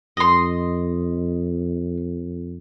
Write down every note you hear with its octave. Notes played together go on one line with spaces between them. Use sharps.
F2 D#5 C6